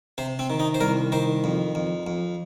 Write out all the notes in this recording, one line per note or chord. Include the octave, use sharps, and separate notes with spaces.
C3 C5
C4
D#3
D#4
C5
C2 A#4
D#3 C5
F2
F2
F2